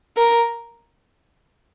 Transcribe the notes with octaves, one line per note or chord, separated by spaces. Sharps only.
A#4